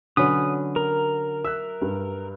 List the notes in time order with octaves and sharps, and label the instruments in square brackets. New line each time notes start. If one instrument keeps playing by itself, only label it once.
[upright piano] D3 [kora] F#3 C#4 B4 [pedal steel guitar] D#6
[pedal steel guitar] A#4
[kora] E5 [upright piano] E6 F#6
[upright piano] G2